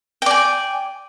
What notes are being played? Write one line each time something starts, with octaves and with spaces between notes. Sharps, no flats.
D5 G5 G#5